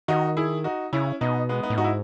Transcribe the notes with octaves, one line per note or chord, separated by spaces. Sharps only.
D#3 D#4 F#4
E4 G#4
D#4 F#4
C#3 C#4 E4
B2 B3 D#4
G#3 B3
B3 D#4
A2
G#2 D#4 F#4
E4